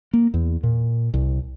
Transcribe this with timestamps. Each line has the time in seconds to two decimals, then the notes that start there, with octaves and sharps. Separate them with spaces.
0.13 A#3
0.34 E2
0.63 A#2
1.14 C2